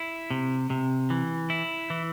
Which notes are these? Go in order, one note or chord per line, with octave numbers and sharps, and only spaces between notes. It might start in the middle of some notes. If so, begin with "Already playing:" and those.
Already playing: E4
C3
C3
E3
E4
E3